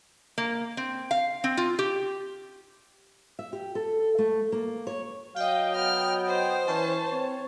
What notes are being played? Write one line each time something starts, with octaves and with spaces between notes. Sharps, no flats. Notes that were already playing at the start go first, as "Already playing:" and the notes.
A#3
C4
F5
C4
F4
G4
E5
G4
A4
A3
A#3
C#5
F#3 D#5 F5 G5
B3 F6
C5
E3 C#4 A5
C4 C#5